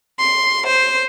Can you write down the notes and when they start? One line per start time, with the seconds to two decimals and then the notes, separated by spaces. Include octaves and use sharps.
0.18 C6
0.65 C5